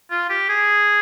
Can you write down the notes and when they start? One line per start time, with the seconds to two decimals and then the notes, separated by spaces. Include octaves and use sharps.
0.11 F4
0.30 G4
0.49 G#4